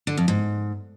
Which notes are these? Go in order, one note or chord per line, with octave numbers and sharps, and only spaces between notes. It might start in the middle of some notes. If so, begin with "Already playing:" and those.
D3
F2
G#2